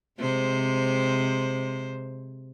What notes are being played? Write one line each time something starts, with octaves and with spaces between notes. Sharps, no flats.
C3 G#3 C5